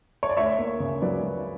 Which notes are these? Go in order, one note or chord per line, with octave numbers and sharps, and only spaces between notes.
C#5
D5
D2 C#5 E5
A#3
C#3
F#3 B4 D5
F#3